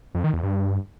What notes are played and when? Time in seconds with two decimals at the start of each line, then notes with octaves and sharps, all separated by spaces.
0.15 F2
0.24 D#3
0.34 E2
0.43 G2